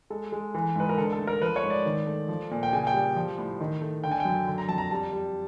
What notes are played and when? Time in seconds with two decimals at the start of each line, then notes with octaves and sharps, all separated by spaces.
0.10 G#3 A4
0.32 G#3
0.55 E3
0.76 G#2 B4
0.89 A#4
0.98 D3 A4
1.13 A4
1.19 A3
1.27 A#4
1.42 F3 B4
1.56 C#5
1.63 G#2
1.70 D5
1.86 D#3
2.07 A3
2.28 F3
2.51 A#2
2.63 G5
2.73 C#3 G#5
2.87 G5
2.94 G3
3.16 F3
3.38 A2
3.60 D#3
3.81 A3
4.04 D3 G5
4.11 G#5
4.20 G5
4.25 F#2
4.47 D3
4.58 A#5
4.69 F2 A5
4.78 A#5
4.91 G3 A5
5.13 G3